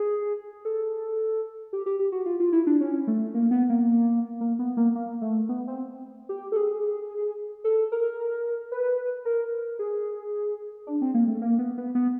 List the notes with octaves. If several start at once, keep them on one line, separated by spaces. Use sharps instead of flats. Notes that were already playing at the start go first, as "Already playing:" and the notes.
Already playing: G#4
A4
G4
G4
G4
F#4
F4
F4
E4
D4
C#4
A3
A#3
B3
A#3
A#3
B3
A#3
A#3
A3
B3
C4
G4
A4
G#4
A4
A#4
B4
A#4
G#4
D4
C4
A#3
A3
A#3
B3
B3
B3